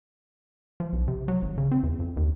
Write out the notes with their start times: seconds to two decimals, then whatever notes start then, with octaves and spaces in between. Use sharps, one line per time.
0.80 F3
0.93 B1
1.08 C3
1.28 F#3
1.42 G#1
1.58 C#3
1.72 C4
1.83 E2
2.00 F2
2.17 D#2